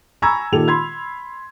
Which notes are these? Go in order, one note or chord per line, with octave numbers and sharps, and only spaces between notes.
G#5 A#5 B5 C#6 E6 G#6
A#2 D#3 G4 A4 F7
B5 C6 G#6